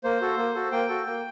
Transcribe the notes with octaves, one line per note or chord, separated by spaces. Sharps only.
A#3 C5
F#4 A4
A#3
F#4 A4
A#3 G5
F#4 A4
A#3